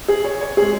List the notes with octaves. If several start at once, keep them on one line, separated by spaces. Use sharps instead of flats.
G#4
C#5
C#5
G#3 G#4